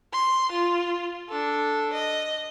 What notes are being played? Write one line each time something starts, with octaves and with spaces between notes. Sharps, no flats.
C6
F4
D4 A4
D#5